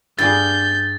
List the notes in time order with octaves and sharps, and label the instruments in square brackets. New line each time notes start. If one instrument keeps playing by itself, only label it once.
[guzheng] G2 [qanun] G#4 D5 F5 [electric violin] G6 [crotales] A6